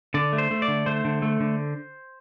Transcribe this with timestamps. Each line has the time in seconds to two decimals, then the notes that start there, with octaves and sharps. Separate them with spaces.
0.14 D3 D5
0.33 A3
0.38 C5
0.51 A3
0.62 D5
0.68 D3
0.86 A3 C5
1.05 D3
1.22 A3
1.40 D3